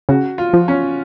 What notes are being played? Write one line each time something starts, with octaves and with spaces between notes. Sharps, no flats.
C#3 F#4
F4
F3
C#4